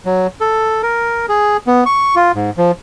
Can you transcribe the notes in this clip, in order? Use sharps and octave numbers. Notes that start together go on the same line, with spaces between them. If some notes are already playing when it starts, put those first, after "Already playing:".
F#3
A4
A#4
G#4
B3
C#6
F4
G#2
F3